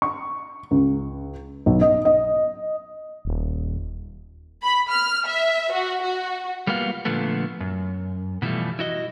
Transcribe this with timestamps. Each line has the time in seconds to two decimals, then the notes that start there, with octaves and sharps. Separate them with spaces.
0.02 C#6
0.71 C#2
1.66 B1
1.81 D#5
2.05 D#5
3.25 D#1
4.63 B5
4.91 F6
5.27 E5
5.73 F#4
6.03 F#4
6.67 G3 A#3 B3 F4 F#4
7.05 A#2 D3 F3 A3 B3
7.60 F#2
8.42 B2 E3 F3 G3 A3
8.79 E4 F#4 D#5